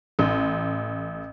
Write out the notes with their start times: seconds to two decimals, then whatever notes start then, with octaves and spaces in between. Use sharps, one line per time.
0.19 A1